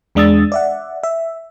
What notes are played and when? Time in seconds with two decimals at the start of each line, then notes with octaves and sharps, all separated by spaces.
0.15 E2 G#3 D4 D#6 E6 A6
0.52 D5 E5 F#5
1.03 E5